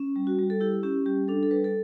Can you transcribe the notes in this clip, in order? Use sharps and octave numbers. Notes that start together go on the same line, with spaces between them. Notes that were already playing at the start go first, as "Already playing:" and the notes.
Already playing: C#4
G3
F#4
G3
A4
E4 G4
C#4 G4
G3 G4
D4 A4
A4
G3 B4
A4